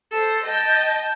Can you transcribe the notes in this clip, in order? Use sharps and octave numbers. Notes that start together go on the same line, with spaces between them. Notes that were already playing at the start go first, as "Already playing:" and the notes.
A4 C5
D#5 G5 A5